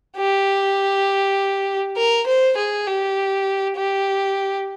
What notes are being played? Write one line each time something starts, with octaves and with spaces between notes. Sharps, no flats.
G4
A#4
C5
G#4
G4
G4